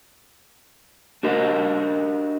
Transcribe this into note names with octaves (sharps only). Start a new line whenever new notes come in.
D4 F#4 A#4 D#5